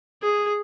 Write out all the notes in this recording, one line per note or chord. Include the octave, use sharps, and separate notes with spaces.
G#4